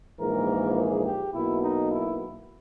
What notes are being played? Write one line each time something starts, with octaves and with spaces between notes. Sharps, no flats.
A#1 G#2 E3 A#3 A#4
G#4
G4
B1 B2 A#3 E4
D#4
E4